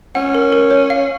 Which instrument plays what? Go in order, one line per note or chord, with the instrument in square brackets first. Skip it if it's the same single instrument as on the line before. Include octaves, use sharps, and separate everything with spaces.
[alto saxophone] C#4 [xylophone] F#5
[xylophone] A#4
A#4
C#5
F5